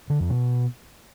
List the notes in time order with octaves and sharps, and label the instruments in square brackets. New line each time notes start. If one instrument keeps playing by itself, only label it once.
[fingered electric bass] D3
F2
B2